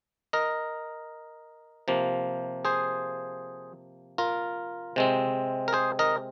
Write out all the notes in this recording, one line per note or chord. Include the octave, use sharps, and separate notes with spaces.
A#4 D#5
C3 F3 A#3
G#4 C5
F4 A#4
C3 G#3 C4
A#4
G#4 C5
A#4 D#5